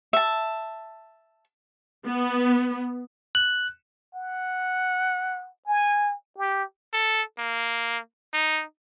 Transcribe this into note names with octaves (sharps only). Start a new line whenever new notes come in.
E5 A5
B3
F#6
F#5
G#5
G4
A4
A#3
D#4